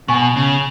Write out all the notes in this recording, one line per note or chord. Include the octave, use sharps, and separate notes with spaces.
B2 G#5 C#6
C#3